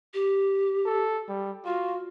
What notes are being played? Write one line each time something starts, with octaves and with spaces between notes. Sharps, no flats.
G4
A4
G3
F4 F#4